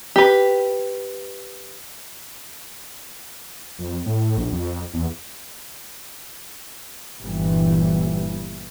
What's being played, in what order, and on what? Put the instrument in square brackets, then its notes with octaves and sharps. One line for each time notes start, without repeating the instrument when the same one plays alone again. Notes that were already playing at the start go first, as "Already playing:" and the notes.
[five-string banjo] G4 B4
[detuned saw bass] F2
A2
A#1
F2
E2
[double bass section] G1 A#2 E3 G3